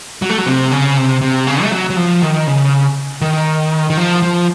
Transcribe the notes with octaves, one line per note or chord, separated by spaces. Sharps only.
F#3
A3
F#3
C3
C#3
C3
C3
C#3
A3
F#3
F#3
F3
D#3
C#3
D#3
D#3
F3
F3